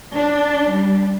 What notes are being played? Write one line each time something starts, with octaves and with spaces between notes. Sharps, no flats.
D4
G3